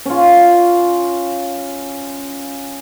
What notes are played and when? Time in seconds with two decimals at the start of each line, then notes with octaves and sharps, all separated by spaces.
0.06 C#4 F4